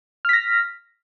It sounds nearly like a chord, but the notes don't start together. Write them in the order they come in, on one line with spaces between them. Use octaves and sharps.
F6 B6 A#6